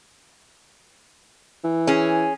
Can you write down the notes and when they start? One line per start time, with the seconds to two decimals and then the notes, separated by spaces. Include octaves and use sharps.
1.64 E3
1.87 C#4 G#4